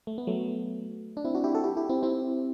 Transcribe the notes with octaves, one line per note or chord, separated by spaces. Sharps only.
A3
B3
F#3 A3
D4
C4 E4
D4 F#4
E4 G4
F#4 A4
E4 G4
E4 G4
C4 E4
C4 E4